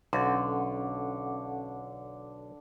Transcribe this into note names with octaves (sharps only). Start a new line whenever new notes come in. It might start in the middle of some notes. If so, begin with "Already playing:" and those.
B1 D3 C#4 A4 F#5 C6